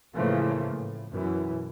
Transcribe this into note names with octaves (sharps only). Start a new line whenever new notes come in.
A2 C#3 E3 F3 A3 A#3
A2
F#2 B2 E3